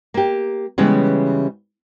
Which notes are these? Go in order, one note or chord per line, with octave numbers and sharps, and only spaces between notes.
A#3 G4
C#3 E3 G3 G#3 B3 C#4